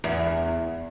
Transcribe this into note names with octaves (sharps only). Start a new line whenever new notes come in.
E2